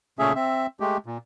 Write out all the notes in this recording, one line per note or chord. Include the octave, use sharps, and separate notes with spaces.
A#2 C#3 A3 C#4 G#4 E5
C4 E5
G#3 A3 G4
A#2